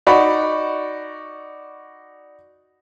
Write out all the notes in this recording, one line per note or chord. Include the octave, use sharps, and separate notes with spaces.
D#4 F#4 D5 B5 C#6